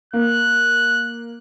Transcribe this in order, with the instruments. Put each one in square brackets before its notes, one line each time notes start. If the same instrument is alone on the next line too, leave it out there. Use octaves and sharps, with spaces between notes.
[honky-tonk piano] A#3 [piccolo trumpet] F#6